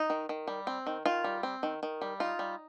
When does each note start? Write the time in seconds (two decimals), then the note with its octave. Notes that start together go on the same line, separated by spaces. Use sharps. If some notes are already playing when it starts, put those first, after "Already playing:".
Already playing: D#4
0.10 D#3
0.29 D#3
0.48 G3
0.67 C4
0.87 D#3
1.06 D#3 F4
1.24 G3
1.43 C4
1.63 D#3
1.83 D#3
2.02 G3
2.20 D#4 F4
2.39 G3